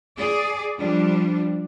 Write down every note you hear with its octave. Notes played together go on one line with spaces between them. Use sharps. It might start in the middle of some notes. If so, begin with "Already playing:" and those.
G#4 D5
F3 G3 D4